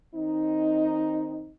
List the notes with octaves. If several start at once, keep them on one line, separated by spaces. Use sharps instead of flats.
D#3 C4 D#4